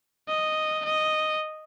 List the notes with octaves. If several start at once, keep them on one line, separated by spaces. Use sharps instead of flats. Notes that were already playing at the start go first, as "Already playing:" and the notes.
D#5
D#5